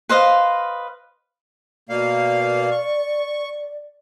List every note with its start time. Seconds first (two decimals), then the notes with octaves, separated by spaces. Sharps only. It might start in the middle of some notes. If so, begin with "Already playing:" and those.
0.09 B4 C5 D#5 F5
1.89 B2 A#3 D5 F5
2.71 C#6